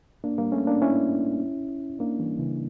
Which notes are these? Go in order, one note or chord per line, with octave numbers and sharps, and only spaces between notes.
A#3 D4
G3 A#3
A3 C#4
A#3 D4
C#4 E4
A#3 D4
E3 G3
C#3 E3